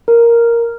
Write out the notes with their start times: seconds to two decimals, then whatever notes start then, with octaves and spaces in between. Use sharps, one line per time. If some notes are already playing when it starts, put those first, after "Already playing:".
0.08 A#4